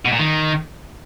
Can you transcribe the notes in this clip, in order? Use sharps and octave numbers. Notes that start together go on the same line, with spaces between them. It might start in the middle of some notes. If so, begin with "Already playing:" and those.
B2
A#2
D#3